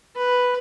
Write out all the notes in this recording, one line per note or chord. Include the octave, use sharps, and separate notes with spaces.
B4